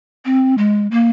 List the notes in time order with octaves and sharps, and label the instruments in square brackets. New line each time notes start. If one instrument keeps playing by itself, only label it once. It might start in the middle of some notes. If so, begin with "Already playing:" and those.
[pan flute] C4
G#3
A#3